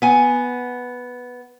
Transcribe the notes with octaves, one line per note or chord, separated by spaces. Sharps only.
B3 G#5